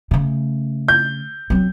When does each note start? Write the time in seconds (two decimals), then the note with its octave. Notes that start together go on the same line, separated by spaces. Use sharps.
0.11 C#3 A3
0.88 G6
1.50 F#3 C4